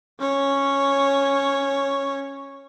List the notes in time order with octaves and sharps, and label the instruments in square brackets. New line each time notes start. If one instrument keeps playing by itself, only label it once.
[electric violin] C#4 C#5